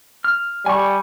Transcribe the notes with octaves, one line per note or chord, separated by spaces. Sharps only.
F6
G3 G#5 C#6